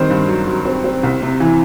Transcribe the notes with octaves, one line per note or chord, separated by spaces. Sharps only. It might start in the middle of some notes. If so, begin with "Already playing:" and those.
Already playing: D#3 G3 C4 C5
G2
F#3
F#3
C4
C4
C2
C3
E3